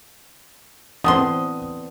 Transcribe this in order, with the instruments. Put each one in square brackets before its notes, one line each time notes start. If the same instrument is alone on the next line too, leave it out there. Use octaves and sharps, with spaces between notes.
[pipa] D3 B3 C6 [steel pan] E3 C4 [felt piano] D#6